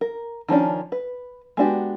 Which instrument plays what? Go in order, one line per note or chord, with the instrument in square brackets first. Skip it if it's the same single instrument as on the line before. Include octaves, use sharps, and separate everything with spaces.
[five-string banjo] A#4
D#3 F3 C#4 D4
B4
G#3 B3 D4 F#4 G4